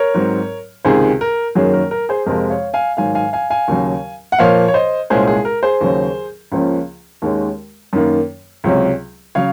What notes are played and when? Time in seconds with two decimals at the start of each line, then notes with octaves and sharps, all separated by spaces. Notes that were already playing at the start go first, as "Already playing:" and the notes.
Already playing: A#4 C#5
0.14 G#2 F#3 C4
0.85 C#2 C3 D#3 G#4 C5
1.21 A#4
1.55 F#2 D#3 F#3 A#3 C#4 G#4
1.73 A#4
1.91 A#4
2.09 G#4 C5
2.26 F2 C3 F3 G#3 A#4
2.50 C#5 F5
2.74 F5 G#5
2.97 G#2 D#3 F#3 F5 G#5
3.15 F5 G#5
3.33 F5 G#5
3.50 F5 G#5
3.68 D#2 C#3 F#3
4.32 F#5
4.39 A#2 F3 A#3 C#5 F5
4.68 C#5
4.74 C5 D#5
5.10 C2 A#2 G#3 C#4 G#4 C5
5.28 G#4
5.45 A#4
5.63 G#4 C5
5.81 D#2 C#3 F#3
6.52 C#2 C#3 F3 A#3 C#4
7.22 D#2 D#3 G#3 C#4
7.93 F#2 D#3 A#3
8.64 C#2 C3 F#3 C#4
9.35 C#3 F#3 C#5 F5